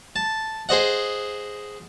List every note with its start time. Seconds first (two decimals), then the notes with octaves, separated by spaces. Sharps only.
0.16 A5
0.69 G#4 C5 D#5 F#5